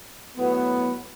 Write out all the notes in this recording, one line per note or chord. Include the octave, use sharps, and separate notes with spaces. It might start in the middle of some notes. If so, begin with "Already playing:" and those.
A2 F#3 B3